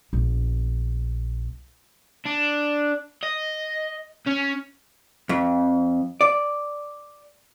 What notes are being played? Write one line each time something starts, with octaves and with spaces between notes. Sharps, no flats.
A#1 B3
D4
D#5
C#4
F2
D5